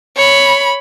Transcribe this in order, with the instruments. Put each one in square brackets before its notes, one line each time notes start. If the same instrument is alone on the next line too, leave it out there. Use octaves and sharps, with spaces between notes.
[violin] C#5 B5